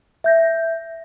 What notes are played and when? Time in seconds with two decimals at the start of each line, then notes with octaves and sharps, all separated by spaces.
0.24 E5 G6 A#6